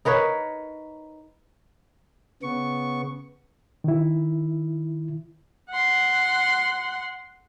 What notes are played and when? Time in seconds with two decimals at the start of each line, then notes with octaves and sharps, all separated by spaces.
0.05 D#4 A#4 B4 C#5
2.43 C#3 B3 C#6
3.84 D#3 E4
5.70 F#5 C6